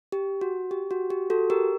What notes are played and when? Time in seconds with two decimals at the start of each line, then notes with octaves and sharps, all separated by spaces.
0.12 G4
0.41 F#4
0.71 G4
0.91 F#4
1.10 G4
1.30 F#4 A4
1.50 G4 A#4